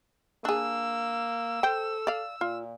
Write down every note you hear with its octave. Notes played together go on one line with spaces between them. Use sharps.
A#3 D4 G#4 E6
A4 C5 G5
D5 F5
A#2 F4